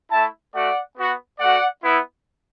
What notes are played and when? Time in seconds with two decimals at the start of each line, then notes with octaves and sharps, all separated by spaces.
0.11 A3 E4 E5 A5
0.54 A3 F#4 D5 F#5
0.97 B3 F#4
1.40 A3 F#4 D5 F#5
1.83 B3 E4